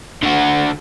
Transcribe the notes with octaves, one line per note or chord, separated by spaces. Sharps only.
D3 F#4